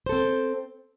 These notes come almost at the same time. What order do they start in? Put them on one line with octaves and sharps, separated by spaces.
C5 A4 C4